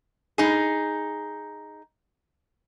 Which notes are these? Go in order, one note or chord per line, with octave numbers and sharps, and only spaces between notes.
D#4 G#4